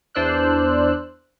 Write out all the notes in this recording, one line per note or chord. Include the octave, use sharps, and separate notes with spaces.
E2 D4 C5 D5 E6 F#6